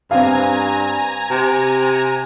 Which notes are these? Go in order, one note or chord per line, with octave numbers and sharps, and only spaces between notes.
G2 C4 F5 G#5 A#5
C3